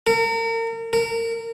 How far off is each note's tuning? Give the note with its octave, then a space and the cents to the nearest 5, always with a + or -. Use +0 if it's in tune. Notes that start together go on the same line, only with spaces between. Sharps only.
A#4 -35
A#4 -25